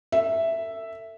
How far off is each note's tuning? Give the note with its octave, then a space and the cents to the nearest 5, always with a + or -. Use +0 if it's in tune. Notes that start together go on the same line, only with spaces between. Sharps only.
A4 +40 E5 +0